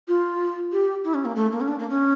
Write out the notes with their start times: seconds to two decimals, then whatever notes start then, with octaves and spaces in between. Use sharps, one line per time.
0.08 F4
0.72 G4
1.04 E4
1.14 C#4
1.25 A#3
1.36 A3
1.52 A#3
1.61 C#4
1.68 D4
1.79 A#3
1.90 C#4